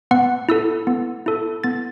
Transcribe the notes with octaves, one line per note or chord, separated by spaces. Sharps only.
B3 F#5
E4 A4 E6
B3
E4 A4
B3 A6